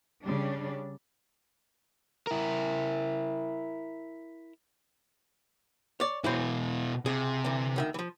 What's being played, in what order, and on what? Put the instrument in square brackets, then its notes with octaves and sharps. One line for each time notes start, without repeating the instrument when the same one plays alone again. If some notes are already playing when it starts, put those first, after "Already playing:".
[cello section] C#3 G3 D4
[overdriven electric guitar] E4 A#4
[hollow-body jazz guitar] C#5 D5
[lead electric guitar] B2 E4 [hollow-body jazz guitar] E3 F#3 C5
[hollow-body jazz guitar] C#2 G#4 [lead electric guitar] C3
[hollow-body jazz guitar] D3 E3
D2 D#3 E5
E3 F3